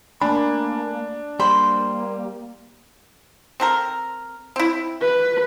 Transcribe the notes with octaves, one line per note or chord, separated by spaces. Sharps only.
A3 A#3 D4 G#5 B5
G3 A#3 C5 G5 B5
C4 A4 A#4
C4 E4
B4